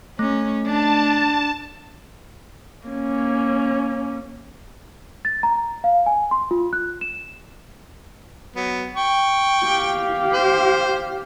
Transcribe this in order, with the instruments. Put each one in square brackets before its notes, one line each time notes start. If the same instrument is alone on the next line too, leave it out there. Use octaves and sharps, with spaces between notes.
[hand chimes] A3 [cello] C#4
[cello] D4 [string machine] A5
[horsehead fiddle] A#3 C#4
[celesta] A6
A#5
F5
G#5
C6
F4
F#6
E7
[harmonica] F#3 B3
G5 C#6
[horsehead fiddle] G4 F5
[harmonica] C5